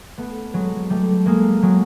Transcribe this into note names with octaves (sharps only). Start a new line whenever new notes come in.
A3 B3
F#3 G#3
G3 A3
G#3 A#3
F#3 G#3